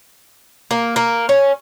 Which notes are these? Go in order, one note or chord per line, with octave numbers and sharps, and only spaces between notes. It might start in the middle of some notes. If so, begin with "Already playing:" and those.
A#3
A#3
C#4